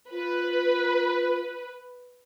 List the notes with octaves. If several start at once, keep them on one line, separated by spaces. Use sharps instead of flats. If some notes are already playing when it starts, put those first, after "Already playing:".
F4 B4